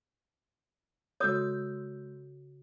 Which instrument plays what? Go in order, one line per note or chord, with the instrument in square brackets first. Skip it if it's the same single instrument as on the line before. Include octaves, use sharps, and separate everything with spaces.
[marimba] C#3 F#4 A4 [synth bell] G#3 E6 G6 [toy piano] C#5 D#6